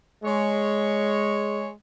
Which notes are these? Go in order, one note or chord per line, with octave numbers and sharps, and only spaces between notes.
G#3 C#5